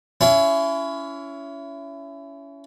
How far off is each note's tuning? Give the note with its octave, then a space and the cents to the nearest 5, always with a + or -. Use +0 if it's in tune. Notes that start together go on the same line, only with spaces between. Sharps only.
C#4 +25 E4 +25 C6 -25